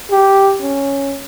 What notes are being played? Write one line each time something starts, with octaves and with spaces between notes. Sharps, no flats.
G4
C#4